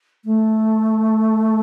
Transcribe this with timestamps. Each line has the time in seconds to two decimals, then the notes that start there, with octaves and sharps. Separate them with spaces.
0.25 A3